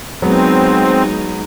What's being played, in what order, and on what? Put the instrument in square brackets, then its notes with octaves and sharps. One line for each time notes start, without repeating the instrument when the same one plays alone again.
[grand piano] F#3 B3 [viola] G#3 D#4 [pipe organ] C4